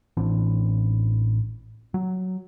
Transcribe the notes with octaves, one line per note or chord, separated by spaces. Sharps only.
A1 E3 C4 D4
F#3